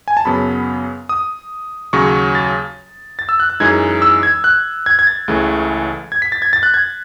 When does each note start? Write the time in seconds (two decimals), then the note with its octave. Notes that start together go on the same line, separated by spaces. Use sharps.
0.08 G#5
0.17 A5
0.25 F#2 C#3 F#3 B3 B5
1.09 D#6
1.93 D#2 C#3 F#3 C#6
2.35 A6
3.19 A6
3.29 E6
3.40 F#6
3.50 F#6
3.60 F#2 E3 G#3 D#4 G#6
4.02 E6
4.23 G#6
4.44 F#6
4.86 G#6
4.99 G#6
5.07 A6
5.28 C#2 C#3 E3 A3
6.12 G#6
6.22 B6
6.32 A6
6.42 G#6
6.53 A6
6.63 F#6
6.74 G#6